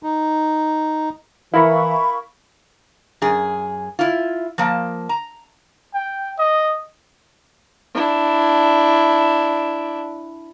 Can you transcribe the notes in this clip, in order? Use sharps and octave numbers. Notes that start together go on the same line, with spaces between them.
D#4
E3 E4 A#4 F5 B5 C#6
F#2 G#4
E4 F4
F3 A#3 A5
A#5
G5
D#5
D4 E4